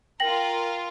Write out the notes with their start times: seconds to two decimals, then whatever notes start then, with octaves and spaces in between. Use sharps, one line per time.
0.20 F4 A#4 G5 A#6 F#7